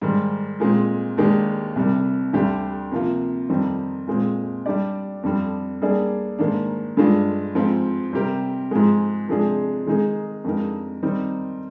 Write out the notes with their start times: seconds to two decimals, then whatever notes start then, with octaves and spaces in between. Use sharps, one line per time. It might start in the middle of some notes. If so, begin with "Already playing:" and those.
0.01 G#2 D#3 G3
0.60 A#2 G#3 C4
1.17 D#2 D#3 G#3 D4 G4
1.76 C2 C3 G3
2.33 D2 D3 G3 D4 G4
2.92 C3 F3 A#3 F4
3.49 F2 D#3 G3 C4 D#4
4.07 A#2 G#3 C4
4.66 G3 D4 G4 D5
5.23 F2 D3 G3 D4
5.82 G3 A#3 D4 G#4 D5
6.39 G#2 D#3 A#3 D4
6.97 G2 D3 G#3 D4 F4
7.55 G#2 F3 C4 F4
8.13 C3 G3 C4 G4 A#4
8.71 G#2 F3 G#3
9.29 C3 F3 G#3 D4 G#4
9.87 D#3 G#3 D#4 G#4
10.44 F2 D3 G#3 D#4 A#4
11.03 D#3 G3 C4 D#4 A#4